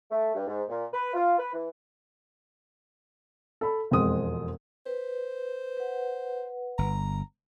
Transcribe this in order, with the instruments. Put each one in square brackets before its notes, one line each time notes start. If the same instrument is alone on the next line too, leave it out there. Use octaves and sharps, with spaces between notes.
[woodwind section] A3
G2
G#2
A#2
B4
F4
B4
E3
[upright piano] A4 B5
E1 F2 G#3 C4 D#6
[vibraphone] B4 [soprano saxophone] C5
[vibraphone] B4 F#5
[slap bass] G1 [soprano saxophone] A#5